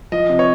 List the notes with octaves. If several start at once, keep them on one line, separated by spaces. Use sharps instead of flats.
F3 D#5
C3
C#5